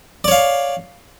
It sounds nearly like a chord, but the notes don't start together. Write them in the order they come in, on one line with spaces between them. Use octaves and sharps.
D5 C#5 F5